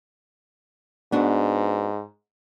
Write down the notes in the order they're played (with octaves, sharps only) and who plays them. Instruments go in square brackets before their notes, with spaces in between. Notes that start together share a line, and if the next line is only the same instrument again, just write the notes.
[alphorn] G#2 [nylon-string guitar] B3 D4 F#4